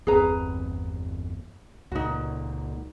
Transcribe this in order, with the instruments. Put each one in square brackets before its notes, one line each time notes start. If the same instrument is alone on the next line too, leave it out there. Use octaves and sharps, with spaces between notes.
[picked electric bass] G1 E2 C4 [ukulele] G#4 B4 A#5
[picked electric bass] C#2 A#2 [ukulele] D#4 F#4